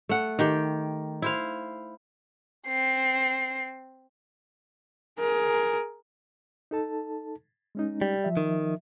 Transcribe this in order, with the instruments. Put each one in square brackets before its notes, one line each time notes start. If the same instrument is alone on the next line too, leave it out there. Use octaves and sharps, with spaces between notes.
[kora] A3 F#5
D#3 G4
E4 C5 F5
[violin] C4 C7
[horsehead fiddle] G#4 A#4
[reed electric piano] D#4 A4 A5
G#3 C#4 D#4
[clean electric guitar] G3
[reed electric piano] F3 E5
[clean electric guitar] D#3